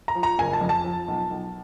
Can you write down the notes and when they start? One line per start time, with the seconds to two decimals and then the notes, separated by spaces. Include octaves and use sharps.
0.08 A#5
0.15 F3
0.23 A#5
0.38 F#1 G#5
0.53 A5
0.61 F2
0.69 A5
0.84 F3
1.08 B1
1.31 B1